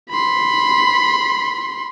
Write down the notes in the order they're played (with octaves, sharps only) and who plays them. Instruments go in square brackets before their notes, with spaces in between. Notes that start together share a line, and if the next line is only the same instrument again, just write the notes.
[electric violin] B5 C6